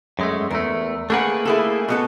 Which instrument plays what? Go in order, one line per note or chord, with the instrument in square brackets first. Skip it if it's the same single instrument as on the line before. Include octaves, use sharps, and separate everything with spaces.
[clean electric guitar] F#2 G#3 A3
[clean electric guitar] E2 A3 [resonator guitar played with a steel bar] A#4
[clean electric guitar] A3 A#3 B4 [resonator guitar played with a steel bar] G#4 A#4 F#5
[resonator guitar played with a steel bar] E4 G#4 A4
B2 B3 A4